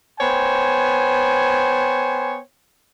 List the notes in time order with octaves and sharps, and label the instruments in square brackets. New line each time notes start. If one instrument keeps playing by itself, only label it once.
[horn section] B3 C5 C#5 G5 G#5